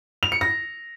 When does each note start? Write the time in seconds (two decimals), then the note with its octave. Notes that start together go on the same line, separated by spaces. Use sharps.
0.23 F7
0.32 C#7
0.41 A#6